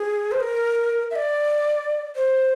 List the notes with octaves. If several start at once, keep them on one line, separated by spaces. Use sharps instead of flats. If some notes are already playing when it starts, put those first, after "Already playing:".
Already playing: G#4
C5
A#4
E5
D5
C5